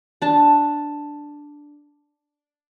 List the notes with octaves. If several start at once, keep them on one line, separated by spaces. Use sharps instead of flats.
D4 A5